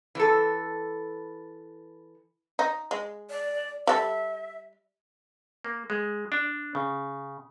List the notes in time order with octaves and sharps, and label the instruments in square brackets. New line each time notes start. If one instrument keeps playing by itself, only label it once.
[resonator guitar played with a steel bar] E3 A4
[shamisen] D#4
G#3
[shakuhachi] D5
[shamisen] G3 A4 [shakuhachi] E5
[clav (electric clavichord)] A#3
G#3
D4
C#3